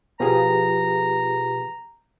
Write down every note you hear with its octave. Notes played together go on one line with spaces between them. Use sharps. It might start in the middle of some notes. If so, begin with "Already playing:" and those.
B2 F3 F4 G4 G#4 B4 A#5